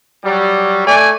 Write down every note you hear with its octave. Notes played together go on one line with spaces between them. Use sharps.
F#3 G3
A3 D5 G#5